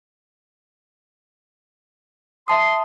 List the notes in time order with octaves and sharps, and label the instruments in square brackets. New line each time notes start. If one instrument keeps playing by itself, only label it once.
[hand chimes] E5 A5 D#6 [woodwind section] C6